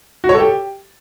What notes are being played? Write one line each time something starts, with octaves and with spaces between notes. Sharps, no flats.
F#4
C#5
A4
G4